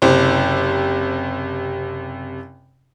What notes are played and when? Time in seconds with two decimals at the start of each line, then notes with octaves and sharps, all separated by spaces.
0.02 F#1 C3 C5